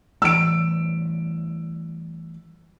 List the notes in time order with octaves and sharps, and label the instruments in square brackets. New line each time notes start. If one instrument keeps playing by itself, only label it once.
[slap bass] E3 G3 A3 [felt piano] E6 D7